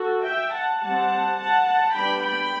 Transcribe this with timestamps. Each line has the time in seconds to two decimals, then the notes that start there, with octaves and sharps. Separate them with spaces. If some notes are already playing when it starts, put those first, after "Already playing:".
Already playing: F#4 A4
0.25 E5 G5
0.53 F#5 A5
0.82 G3 C4 F#5 A5
1.38 F#5 A5
1.66 F#5 A5
1.95 G3 B3 D4 G5 B5
2.23 G5 B5